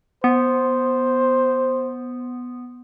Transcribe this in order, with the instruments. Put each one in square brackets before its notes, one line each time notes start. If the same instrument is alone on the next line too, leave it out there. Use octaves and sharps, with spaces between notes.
[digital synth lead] B3 [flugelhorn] C5